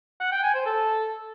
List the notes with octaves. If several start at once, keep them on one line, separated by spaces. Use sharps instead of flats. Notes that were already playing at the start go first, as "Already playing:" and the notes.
F#5
G5
G#5
C5
A4